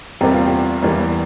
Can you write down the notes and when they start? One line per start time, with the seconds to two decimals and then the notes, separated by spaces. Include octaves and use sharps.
0.21 E2 C3 G3 A#3 G4
0.33 F4
0.46 G4
0.83 E2 E3 G3 A#3